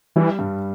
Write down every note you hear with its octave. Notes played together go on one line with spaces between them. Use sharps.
E3 G3
G2